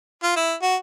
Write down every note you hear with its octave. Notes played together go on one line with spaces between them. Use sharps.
F4
E4
F#4